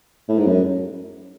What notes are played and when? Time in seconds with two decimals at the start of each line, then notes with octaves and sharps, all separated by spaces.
0.29 A2
0.38 G#2
0.47 F#2